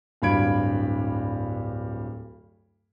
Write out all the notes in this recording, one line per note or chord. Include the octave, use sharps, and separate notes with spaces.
D1 G2 F5 B5 G#6 D7